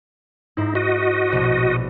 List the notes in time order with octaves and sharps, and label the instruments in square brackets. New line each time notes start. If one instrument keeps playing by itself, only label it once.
[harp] G#2 E4 C5 [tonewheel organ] D#4
[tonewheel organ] F#4 D#5
[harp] A#1 B2